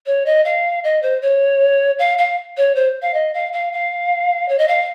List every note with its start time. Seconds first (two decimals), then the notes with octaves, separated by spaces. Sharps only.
0.06 C#5
0.26 D#5
0.45 F5
0.84 D#5
1.02 C5
1.21 C#5
1.99 F5
2.18 F5
2.57 C#5
2.75 C5
3.02 F5
3.14 D#5
3.34 F5
3.53 F5
3.73 F5
4.48 C#5
4.58 D#5
4.68 F5